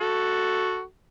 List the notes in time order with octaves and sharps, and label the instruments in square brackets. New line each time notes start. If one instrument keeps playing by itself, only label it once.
[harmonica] F#4 A4